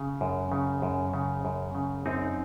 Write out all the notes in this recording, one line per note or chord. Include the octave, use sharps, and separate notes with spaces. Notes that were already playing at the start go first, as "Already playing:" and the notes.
Already playing: C#3
F#2
C#3
F#2
C#3
F#2
C#3
F#2 C4 D#4